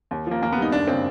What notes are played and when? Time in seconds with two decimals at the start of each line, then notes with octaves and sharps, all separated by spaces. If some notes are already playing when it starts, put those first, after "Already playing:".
0.11 D#2
0.27 F3 A#3
0.42 D#2 A#3
0.52 B3
0.57 G3 D#4
0.72 F#1 D4
0.88 C#3 C4